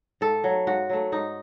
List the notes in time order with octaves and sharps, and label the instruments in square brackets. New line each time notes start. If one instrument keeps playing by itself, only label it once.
[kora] G#2 A4
F#3 A3
G#2 F#4
F#3 A3
G#2 D#4